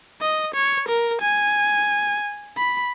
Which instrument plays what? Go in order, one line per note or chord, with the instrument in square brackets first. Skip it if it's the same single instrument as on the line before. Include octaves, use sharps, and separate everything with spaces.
[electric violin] D#5
C#5
A#4
G#5
B5